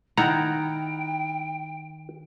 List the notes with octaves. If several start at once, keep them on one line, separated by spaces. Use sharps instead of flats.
D#3 E4 F#5 G5 A#5